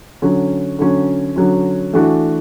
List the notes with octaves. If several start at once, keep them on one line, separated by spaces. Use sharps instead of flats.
D3 F#3 C#4
D3 F#3 C#4
D3 F#3 C#4
E3 A3 D4 F#4